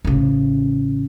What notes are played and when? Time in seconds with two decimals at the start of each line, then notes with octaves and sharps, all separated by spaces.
0.05 A1 C#3